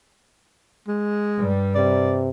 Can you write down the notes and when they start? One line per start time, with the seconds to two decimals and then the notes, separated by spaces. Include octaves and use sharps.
0.88 G#3
1.37 G2 G3
1.75 C3 D5